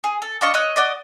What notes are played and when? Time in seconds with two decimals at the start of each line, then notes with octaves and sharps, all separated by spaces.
0.04 G#4
0.22 A4
0.41 D4 F4 D#5 C#6
0.54 C#5 D#5 E6 F#6
0.76 F#4 D5 D#5